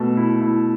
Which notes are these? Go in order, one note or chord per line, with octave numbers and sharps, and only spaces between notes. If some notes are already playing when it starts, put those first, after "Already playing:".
Already playing: B2 A3
E4
E4